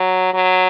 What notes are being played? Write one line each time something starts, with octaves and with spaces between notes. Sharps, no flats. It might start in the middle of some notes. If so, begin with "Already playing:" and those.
Already playing: F#3
F#3